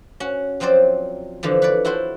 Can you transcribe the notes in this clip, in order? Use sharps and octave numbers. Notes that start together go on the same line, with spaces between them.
C#4 F#4
F3 F#3 C4 C5 D5
D3 E3 F3
B4 C#5 D5
E4 F#4 A4 C5